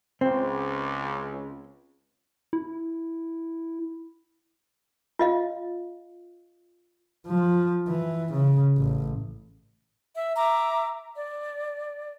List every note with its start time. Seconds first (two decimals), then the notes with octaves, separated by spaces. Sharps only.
0.21 C#2 C4
2.53 E4
5.19 F4 D#5 F5
7.27 F3
7.88 E3
8.33 C#3
8.78 A1
10.15 E5
10.37 E5 A#5 D6
11.16 D5